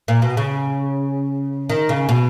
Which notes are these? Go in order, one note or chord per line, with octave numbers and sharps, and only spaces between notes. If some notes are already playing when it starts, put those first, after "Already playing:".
A#2
B2
C#3
D#3
C#3
B2